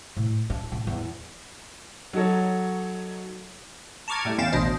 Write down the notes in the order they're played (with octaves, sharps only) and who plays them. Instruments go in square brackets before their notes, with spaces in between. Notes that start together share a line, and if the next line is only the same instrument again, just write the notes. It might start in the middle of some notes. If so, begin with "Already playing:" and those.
[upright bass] A2
D4
A2
E2
[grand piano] F#3 D#4 F#4 A4 C#5
[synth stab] A5 A#5 C#6 D6 F6 G#6
A2 G3 A3
E2 C#4 F5 G5 A6 E7
A1 D2 B2 D4 C5 D#5